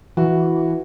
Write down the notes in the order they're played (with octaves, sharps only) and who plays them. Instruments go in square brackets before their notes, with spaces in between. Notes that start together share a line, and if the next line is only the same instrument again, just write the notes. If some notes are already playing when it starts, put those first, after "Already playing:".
[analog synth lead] E3 [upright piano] F#4